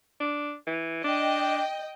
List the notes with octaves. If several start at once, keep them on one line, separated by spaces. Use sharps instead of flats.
D4
E3
D4 D#5 G5